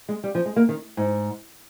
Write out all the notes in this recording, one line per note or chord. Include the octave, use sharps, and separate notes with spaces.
G#3
G3
F3
G#3
A#3
D#3
G#2